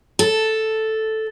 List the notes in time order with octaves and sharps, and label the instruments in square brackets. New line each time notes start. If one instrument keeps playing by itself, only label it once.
[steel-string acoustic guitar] A4